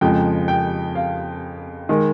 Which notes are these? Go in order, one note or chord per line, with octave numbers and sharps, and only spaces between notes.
F2 C#3 F3 G#3 G5
G5
F5
D#3 G#3